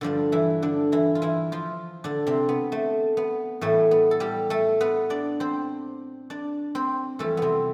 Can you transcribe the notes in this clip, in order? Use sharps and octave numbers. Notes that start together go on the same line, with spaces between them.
G2 D3 F3 D4
E3 E4
D3 D4
E3 E4
F4
E3 E4
F3 F4
D3 D4
C3 C4
B3
A3
B3
A2 E3 G3 A3
B3
A4
G3 G4
A3 A4
B3 B4
D4 D5
C4 C5
D4 D5
C4 C5
F2 E3 G3 A3 A4
C3 B3 C4